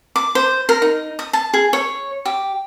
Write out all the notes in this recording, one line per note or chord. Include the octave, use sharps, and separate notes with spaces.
D6
C5
A#4
D#4
D#6
A5
G#4
C#5
G4